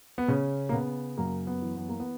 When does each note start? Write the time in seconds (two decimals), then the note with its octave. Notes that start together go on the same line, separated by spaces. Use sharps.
0.18 B3
0.28 C#3 C#4
0.69 A#3
0.73 C#3 B3
1.18 F#2 A#3
1.47 B3
1.62 E3
1.76 B3
1.89 A#3
2.00 B3